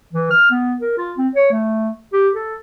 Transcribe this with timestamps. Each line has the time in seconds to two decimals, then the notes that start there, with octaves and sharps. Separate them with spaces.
0.13 E3
0.31 F6
0.51 B3
0.81 A#4
0.97 F4
1.18 C4
1.35 C#5
1.52 A3
2.13 G4
2.35 A4